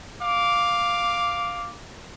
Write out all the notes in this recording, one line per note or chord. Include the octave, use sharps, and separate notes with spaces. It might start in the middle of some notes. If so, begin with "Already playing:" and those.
F5 D6